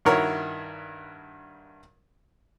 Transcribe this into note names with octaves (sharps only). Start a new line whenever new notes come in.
G2 D#3 E4 F#4 A#4 C#5